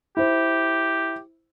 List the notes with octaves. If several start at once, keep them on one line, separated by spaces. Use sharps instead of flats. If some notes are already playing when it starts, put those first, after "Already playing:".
E4 G4 C5